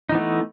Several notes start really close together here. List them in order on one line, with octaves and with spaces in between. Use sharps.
D#4 E3 B3 A3